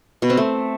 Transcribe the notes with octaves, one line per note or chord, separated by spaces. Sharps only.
B2
C4
A3